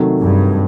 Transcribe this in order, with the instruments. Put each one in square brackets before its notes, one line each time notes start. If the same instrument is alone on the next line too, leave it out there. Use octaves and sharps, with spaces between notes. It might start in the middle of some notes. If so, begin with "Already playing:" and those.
Already playing: [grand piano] C3 D#3 F#3 A3
[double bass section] G2